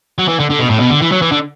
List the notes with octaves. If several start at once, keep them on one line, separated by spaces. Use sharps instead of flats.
F#3
E3
D3
D3
B2
A2
B2
D3
E3
F#3
E3
D3